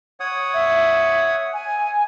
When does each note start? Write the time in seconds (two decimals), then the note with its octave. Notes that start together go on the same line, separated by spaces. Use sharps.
0.20 C#5 F#5 D#6
0.54 E5
1.53 G#5